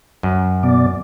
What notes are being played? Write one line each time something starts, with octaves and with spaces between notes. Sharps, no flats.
F#2
B2 D5